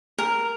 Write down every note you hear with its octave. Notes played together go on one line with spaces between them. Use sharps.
A#4